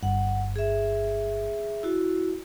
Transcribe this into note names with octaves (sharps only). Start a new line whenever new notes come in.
G1 G2 F#5
G#4 E5
E4 F#4